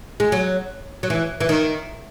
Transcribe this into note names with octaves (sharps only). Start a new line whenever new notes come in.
G#3
F#3
F#3
E3
E3
D#3